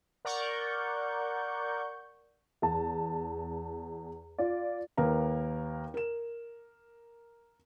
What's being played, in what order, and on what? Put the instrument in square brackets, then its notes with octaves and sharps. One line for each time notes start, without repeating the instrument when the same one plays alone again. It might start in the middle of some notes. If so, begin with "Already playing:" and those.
[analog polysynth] A#4 D5 F#5 C#6 G6
[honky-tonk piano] E2 A5
F4 D5
[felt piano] D#2 A#3 A#4 B4 F5 A#5
A#4 E7